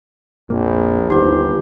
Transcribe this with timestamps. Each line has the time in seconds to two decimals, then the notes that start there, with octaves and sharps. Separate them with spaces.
0.50 A#1 F2 A#2 A#3
1.10 G1 D#2 D#4 G4 C5